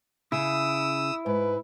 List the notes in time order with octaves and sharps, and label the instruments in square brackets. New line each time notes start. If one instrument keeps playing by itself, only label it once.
[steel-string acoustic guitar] C#3 [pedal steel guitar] E4 [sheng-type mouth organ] D#6 E6
[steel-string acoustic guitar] G#2 [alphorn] B4